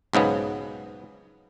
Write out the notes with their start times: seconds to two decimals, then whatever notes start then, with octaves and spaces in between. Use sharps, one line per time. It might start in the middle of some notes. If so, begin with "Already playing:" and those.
0.13 B1 G#2 C#3 B3